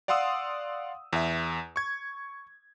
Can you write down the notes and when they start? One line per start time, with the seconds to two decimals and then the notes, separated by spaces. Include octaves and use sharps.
0.08 D5 F5 F#5 C6 D#6 E6
1.13 E2 E5
1.76 C#6 G#6